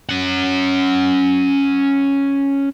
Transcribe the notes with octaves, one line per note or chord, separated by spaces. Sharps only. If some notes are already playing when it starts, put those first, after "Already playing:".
C#4 F#5